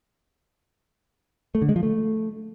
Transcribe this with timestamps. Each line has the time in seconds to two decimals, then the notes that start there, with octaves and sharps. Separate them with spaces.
1.55 A3
1.62 D3
1.69 G#3
1.76 F3
1.83 A3